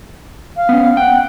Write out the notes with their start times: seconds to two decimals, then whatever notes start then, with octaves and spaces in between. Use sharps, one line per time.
0.57 F5
0.69 B3 C#4
0.97 F#5 G5